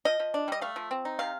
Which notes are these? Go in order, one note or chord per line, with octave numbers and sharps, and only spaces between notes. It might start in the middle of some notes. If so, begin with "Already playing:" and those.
F3 D#5
F3
D4
G3 D#5
A3 F5
F3
C4
D#4
C3 F5